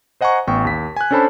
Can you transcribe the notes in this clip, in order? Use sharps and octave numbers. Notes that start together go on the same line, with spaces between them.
C5 D#5 F#5 G#5 A#5 C#6
A1 B3 G5 C#6
D#2 B6
G#5 F#6
C#4 D4 A4 C5 A5 B5